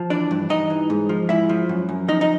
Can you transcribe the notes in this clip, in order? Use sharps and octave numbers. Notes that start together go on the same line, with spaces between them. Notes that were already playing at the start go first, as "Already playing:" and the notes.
Already playing: F3
E3 D4 D5
G2
G2 D#4 D#5
E3
G#2
F3
G#2 E4 E5
F3
F#2
F#2
F3 D#4 D#5
D#4 D#5